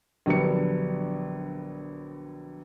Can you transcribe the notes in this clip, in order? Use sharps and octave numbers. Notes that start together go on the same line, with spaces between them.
A#1 D3 F#3 G3 B3 C#7